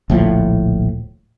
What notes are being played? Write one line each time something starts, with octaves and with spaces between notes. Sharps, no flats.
D1 A#1 A2 F3